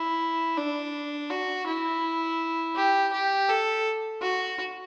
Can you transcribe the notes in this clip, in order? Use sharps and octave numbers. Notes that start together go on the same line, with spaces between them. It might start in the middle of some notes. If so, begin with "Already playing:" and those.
Already playing: E4
D4
F#4
E4
G4
G4
A4
F#4